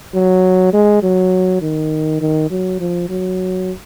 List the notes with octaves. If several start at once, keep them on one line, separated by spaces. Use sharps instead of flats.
F#3
G#3
F#3
D#3
D#3
F#3
F3
F#3